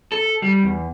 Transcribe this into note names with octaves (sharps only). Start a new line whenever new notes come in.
A4
G3
E2